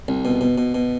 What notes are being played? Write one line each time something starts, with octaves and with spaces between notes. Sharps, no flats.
C2
B2
B2
B2
B2